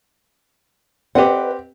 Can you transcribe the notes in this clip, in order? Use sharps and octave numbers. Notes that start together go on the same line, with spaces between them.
C4 G4 B4 D#5 F#5